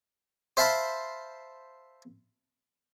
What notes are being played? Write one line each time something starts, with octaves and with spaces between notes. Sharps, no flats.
C5 E5 F5 A5 B5 C6